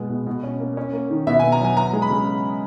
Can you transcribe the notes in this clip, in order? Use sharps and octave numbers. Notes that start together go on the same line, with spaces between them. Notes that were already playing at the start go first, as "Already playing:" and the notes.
Already playing: B2 G#3 B3
B2
B2
C#4
A#3
C#4
A#3
D#3
B2 E5
G#5
B3
A#5
F#3 G#5
B3 A#5
G#3
B5
C#3